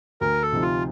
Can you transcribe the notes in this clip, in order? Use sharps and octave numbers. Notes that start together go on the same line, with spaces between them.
D2 A#4
A4
C3 F3 C4 D#4
F4